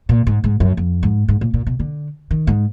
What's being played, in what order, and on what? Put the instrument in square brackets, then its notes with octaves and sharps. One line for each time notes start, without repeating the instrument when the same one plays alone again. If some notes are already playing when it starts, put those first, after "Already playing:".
[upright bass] A#2
G#2
G#2
F#2
F2
G#2
G#2
A#2
A#2
B2
D3
D#3
G#2